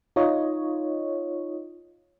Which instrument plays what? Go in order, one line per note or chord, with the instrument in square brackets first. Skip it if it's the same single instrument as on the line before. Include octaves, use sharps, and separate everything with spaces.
[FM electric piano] D#4 F4 C#5 D#5